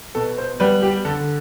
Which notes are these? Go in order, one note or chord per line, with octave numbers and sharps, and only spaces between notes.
B2 A4
C5
G3 B3 B4
G4
D3 A4